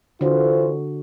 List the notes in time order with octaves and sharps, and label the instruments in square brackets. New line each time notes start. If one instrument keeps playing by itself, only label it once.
[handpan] D3 F#4 [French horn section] E3 F4 C5